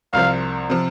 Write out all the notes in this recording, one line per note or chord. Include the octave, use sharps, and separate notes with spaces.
C2 C3 F3 F5
C3 F3